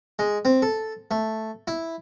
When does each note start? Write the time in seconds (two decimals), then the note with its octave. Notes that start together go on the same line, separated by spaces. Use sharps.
0.19 G#3
0.45 C4
0.62 A4
1.11 A3
1.67 E4